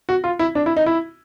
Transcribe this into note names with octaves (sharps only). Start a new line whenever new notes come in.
F#4
F4
E4
D4
E4
D#4
E4